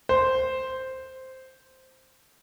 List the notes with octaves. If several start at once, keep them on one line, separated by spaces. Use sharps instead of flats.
C5